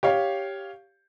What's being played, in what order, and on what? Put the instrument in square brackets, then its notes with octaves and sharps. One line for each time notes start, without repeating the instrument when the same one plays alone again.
[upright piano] G4 C#5 F5